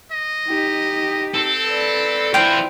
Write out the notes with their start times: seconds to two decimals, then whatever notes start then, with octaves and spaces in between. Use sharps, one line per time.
0.12 D#5
0.48 D#4 G4
1.34 C4 A4
1.68 B4 D5
2.34 E3 F4 C5 G5